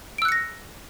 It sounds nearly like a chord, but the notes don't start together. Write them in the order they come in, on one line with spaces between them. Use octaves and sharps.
D7 E6 F#6 C#7 A#6